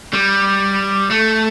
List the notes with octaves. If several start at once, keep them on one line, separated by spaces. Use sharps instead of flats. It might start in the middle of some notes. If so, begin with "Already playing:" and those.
G3
A3